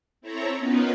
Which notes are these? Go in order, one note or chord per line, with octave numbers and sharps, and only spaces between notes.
C4 E4 A4 C#5 A#5
B3 C#4 D#4 F4 A#4 B4